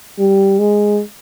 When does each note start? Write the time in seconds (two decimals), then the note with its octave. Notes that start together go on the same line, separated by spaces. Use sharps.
0.19 G3
0.59 G#3